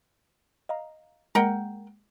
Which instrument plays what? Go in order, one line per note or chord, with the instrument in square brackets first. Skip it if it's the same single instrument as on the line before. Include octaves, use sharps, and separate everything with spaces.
[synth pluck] D#5 F5 A#5
[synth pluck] G#3 A#3 [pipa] A#4 F#5 G5